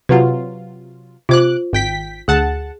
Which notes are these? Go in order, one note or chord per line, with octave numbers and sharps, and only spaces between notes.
C3 F#3 F4 B4 F#5
C3 F4 C5 D6 F#6
G#1 G5 B6
D2 G#4 F#5 A5